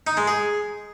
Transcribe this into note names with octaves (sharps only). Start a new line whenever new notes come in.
D#4
G#3
G#4